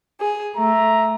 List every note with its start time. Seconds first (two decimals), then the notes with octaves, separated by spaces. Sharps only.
0.20 G#4
0.57 A3 E5 A#5